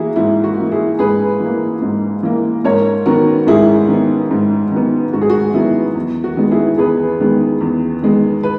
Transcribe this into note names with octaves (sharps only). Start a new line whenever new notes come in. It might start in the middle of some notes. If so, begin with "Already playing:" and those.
Already playing: E3 A#3 E4 F#4 G#4
G#2 E4
F#4
E3 A#3
E4 G#4
G#2 G#4 B4
E3 A#3
G#2
E3 A#3
G#2 A#4 C#5
D#3 F#3 B3 F#4 A#4
G#2 E4 G#4
D#3 F#3 B3
G#2
D#3 F#3 B3
G#2 F#4
G#4
F#4
D#3 F#3 B3 E4
E2
F#4
D#3 G#3 B3
E4 G#4
E2 G#4 B4
D#3 G#3 B3
E2
D#3 G#3 B3
B4